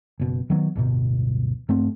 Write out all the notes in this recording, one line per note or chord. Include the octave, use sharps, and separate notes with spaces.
F#1 B2
D#3 F#3 B3
D1 G1 B2
G2 A3 C4